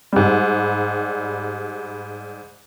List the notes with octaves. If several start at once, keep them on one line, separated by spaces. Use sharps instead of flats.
G#2 G3